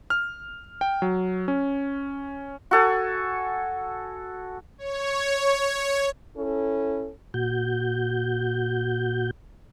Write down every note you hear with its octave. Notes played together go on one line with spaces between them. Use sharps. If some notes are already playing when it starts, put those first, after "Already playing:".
F6
G5
F#3
C#4
F#4 A4 G#5
C#5
C#4 E4 A4
A#2 F#4 G6